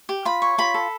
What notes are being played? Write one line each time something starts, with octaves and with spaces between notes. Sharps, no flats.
G4
F4 B5
C#5
F4 B5
A4